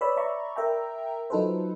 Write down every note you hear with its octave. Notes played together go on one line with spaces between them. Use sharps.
B4 C#5 D5 B5 E6
D5 E5 A#5 B5 C#6
A#4 E5 G5 A#5
F#3 D#4 F4 A4 B4 C5